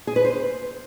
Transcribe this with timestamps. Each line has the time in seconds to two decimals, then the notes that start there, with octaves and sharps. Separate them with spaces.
0.07 G#4
0.16 B4
0.25 C5